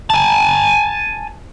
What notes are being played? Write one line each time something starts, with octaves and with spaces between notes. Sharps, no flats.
G#5 A5